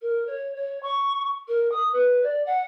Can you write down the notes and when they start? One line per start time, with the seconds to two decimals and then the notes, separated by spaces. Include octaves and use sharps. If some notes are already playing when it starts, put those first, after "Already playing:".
0.02 A#4
0.27 C#5
0.55 C#5
0.82 C#6
1.48 A#4
1.71 D#6
1.92 B4
2.23 D5
2.46 F#5